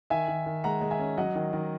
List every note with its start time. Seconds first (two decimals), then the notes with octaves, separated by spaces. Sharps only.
0.10 D#3 E5 G#5
0.28 D#3
0.46 D#3
0.64 G#3 F#5 A#5
0.81 G#3
0.91 E5 G#5
0.99 C#4
1.17 F#3 D#5 F#5
1.35 D#3
1.53 D#3